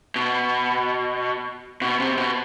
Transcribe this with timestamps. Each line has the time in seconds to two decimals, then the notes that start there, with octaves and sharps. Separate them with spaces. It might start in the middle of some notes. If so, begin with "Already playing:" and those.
0.16 B2
1.82 B2
2.00 C3
2.17 B2